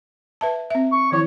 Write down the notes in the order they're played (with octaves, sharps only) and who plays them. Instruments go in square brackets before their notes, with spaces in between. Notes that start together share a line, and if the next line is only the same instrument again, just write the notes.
[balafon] B4 E5 A5
C4 E5
[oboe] C#6
[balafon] D#3 F3 E4 [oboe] C#5